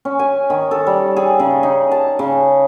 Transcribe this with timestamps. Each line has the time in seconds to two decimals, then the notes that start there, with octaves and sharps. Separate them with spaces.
0.05 C#4
0.19 G#5
0.50 D#3
0.71 A4
0.87 G3
1.16 G#4
1.40 C#3
1.63 D#4
1.92 A5
2.19 C#3